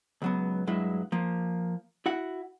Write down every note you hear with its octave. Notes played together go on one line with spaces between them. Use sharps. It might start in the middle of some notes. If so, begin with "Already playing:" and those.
C#2 F#3 B3
G2 F#3 G#3 E4
F3 A#3
E4 F#4 F#5